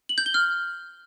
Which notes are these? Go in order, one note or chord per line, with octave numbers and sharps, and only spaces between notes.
F#7
G6
G7
F6